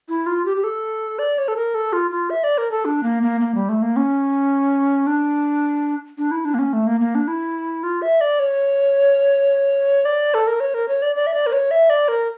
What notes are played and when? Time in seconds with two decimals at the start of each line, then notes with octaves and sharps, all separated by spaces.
0.09 E4
0.26 F4
0.45 G4
0.57 G4
0.64 A4
1.19 D5
1.38 C#5
1.48 A4
1.56 A#4
1.74 A4
1.93 F4
2.11 F4
2.30 E5
2.44 D5
2.58 A#4
2.71 A4
2.85 D4
3.03 A#3
3.23 A#3
3.40 A#3
3.55 G3
3.69 A3
3.82 A#3
3.96 C#4
5.07 D4
6.18 D4
6.31 E4
6.45 D4
6.54 A#3
6.59 C#4
6.73 A3
6.87 A#3
7.00 A#3
7.15 D4
7.28 E4
7.83 F4
8.02 E5
8.21 D5
8.39 C#5
10.05 D5
10.34 A4
10.47 A#4
10.60 C#5
10.74 A#4
10.88 C#5
11.02 D5
11.16 D5
11.26 E5
11.34 D5
11.46 A#4
11.52 C#5
11.71 E5
11.90 D5
12.08 A#4